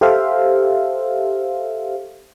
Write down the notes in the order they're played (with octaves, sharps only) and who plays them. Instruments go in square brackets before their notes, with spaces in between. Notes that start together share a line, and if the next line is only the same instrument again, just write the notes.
[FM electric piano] G4 A4 C5 E5 F5